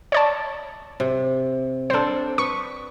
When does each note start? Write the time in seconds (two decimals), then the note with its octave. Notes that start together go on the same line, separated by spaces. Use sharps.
0.12 C#5 D5 A5
1.00 C3
1.90 C4 D4 A4 C5
2.38 B4 C#6